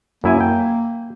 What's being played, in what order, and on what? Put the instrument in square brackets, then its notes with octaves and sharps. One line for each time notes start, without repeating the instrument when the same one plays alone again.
[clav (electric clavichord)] F#2 E4 G#5 [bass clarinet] A#3
[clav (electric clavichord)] G5